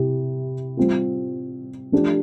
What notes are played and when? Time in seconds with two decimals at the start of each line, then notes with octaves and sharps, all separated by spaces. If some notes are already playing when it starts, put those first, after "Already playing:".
Already playing: C3 E4 G4
0.77 G3 C4 F4
1.92 F3 A3 D4 G4